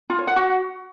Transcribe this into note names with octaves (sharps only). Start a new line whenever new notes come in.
F4
C#5
F#5
F#4